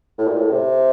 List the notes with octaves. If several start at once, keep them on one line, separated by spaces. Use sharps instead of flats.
A2
A#2
A2
C3